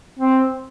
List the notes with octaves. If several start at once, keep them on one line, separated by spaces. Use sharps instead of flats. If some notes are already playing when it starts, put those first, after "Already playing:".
C4